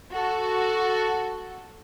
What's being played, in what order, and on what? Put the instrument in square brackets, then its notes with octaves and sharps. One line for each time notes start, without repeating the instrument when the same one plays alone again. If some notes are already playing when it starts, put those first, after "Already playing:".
[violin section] F#4 A4